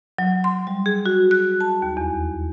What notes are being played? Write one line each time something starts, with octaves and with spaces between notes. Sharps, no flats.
F#3
C6
G3
G#4
F#4
F#6
A5
D#2
E2